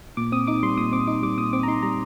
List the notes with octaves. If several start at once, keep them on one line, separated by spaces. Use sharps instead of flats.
A#2 D6
C4 D#6
D#4 D6
G3 C6
A#2 D#6
C4 D6
D#4 D6
G3 D6
A#2 D#6
C4 D6
A#5
D#4 C6
G3 A#5